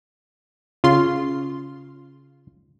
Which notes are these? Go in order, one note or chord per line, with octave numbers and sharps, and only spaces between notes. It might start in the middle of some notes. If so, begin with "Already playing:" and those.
C#3 F4 C6